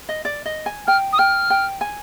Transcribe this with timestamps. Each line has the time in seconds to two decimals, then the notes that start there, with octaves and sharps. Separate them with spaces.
0.09 D#5
0.25 D5
0.46 D#5
0.66 G#5
0.87 G5 F6
1.13 D#6
1.19 G5 F6
1.50 G5
1.81 G#5